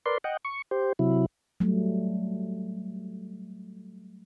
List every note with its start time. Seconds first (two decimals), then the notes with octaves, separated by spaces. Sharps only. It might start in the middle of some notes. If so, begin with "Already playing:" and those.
0.06 A#4 B4 D5 C6
0.24 D#5 F#5 G5
0.45 C#6
0.71 G4 C5
0.99 C3 F#3 E4
1.60 F#3 G3 A3